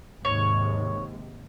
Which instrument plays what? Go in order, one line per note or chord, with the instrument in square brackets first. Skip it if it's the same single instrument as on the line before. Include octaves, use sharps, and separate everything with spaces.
[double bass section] D#2 G#2 C3 [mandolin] C#5